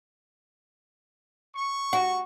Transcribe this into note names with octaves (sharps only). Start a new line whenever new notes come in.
C#6
F#4